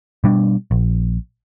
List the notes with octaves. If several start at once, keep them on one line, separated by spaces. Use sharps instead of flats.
B2 G3 D4
A#1